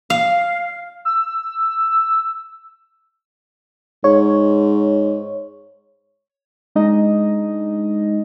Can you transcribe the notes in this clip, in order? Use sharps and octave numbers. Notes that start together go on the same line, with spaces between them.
F5
E6
G#2 C#5
G#3 D4 D#4 D#5